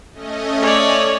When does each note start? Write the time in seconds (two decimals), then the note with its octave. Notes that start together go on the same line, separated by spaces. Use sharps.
0.13 A3 C#4 D#5
0.62 C#5 D5